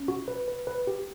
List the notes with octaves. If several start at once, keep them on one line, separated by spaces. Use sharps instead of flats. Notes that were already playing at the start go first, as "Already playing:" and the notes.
Already playing: C#4
F#4
B4
B4
B4
G4